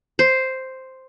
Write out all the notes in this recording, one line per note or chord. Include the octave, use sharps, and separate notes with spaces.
C5